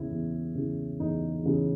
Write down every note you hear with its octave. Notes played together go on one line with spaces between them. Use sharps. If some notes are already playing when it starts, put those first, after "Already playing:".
Already playing: E2 C#3 E3 E4
E2
C#3 E3
E2 D#4
C#3 E3